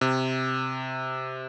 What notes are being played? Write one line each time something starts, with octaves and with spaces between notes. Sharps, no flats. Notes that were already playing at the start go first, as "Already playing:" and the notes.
C3